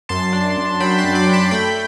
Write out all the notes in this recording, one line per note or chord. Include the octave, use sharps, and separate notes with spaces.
F#2 A5 C6
D4
F#2
F#3 G5 B5
A5 C6
F#2
B5 D6
D4
A5 C6
A3 G5 B5